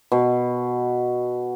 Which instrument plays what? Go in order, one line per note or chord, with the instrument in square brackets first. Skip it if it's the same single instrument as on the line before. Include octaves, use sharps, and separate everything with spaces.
[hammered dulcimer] B2